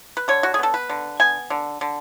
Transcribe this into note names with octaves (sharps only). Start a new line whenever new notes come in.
B4
D3 C#5
F#4
G#4
B3 A4
B4
D3
B3 G#5
D3
D3